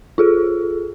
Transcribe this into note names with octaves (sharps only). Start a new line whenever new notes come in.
F4 G#4 A4